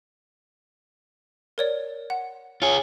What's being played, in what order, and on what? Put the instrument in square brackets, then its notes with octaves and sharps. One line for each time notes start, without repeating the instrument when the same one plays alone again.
[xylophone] A#4 C#5 D5
F#5
[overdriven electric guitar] F4 G#4 [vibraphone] C#5